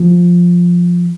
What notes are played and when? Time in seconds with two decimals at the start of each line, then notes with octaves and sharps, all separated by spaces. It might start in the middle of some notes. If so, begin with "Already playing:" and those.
Already playing: F3